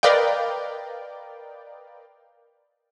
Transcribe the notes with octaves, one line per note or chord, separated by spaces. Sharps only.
A#4 B4 D5 D#5 F5 G5